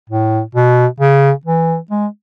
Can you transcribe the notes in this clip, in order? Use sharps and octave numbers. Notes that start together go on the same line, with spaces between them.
A2
B2
C#3
E3
G#3